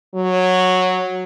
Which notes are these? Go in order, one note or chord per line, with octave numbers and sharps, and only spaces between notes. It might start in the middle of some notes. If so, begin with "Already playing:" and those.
F#3